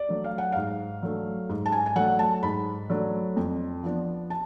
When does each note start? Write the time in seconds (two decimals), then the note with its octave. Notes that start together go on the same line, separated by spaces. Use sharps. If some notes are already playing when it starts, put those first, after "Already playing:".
Already playing: D5
0.09 F#3 A3 D4
0.24 F5
0.38 F#5
0.52 G#2 F5
1.03 F#3 A3 D4
1.49 G#2
1.66 A5
1.72 G#5
1.86 G#5
1.96 F#3 A3 D4 F#5
2.19 A5
2.42 G#2 B5
2.90 F#3 A3 D4
3.36 F2
3.83 F3 B3 D4
4.30 A5